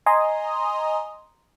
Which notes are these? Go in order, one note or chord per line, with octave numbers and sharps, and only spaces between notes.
D#5 G#5 A#5 C6 D#6